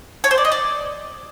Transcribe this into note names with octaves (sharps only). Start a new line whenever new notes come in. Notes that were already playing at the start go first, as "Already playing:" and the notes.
C#5
C5
D5
D#5
D5